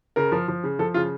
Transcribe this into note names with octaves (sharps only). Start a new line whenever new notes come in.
C#3 A#4
F3
F3
C#3
F3 A4
C#3 F4